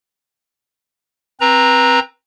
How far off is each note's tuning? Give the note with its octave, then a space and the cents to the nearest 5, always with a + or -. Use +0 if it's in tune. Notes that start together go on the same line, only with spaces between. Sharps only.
C4 +15 B4 -25 A#5 +0